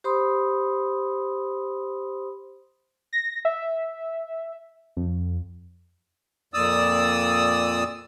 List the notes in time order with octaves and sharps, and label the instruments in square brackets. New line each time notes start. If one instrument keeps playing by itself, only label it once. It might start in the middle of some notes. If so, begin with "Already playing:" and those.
[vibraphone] G4 C5 B5 C6 D#6
[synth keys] A#6
E5
F2
[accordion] F2 A#2 D5 D#6 E6